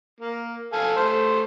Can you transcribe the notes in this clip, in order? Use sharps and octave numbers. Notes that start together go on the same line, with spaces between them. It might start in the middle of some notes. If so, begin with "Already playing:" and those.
A#3
A4 F5 G#5
A3 C5